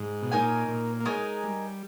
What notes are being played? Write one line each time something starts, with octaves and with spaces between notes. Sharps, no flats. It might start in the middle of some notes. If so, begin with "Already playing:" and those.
Already playing: G#2
B2
A#2 D#4 A#4 C#5 G#5
A#2
A#3
G#3 D#4 A#4 C#5 G#5
G3